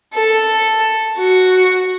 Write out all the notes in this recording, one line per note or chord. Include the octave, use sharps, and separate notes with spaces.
A4
F#4